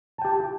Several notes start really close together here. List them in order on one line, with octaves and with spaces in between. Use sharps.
A5 G5 G4